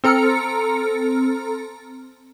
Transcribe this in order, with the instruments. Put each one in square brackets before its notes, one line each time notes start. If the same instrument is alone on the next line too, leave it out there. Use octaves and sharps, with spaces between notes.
[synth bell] C4 A4 A#5 F6 C#7